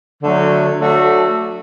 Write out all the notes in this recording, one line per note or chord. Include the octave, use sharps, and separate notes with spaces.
D3 F#3 A3
F#3 A3 D4 F#4 A4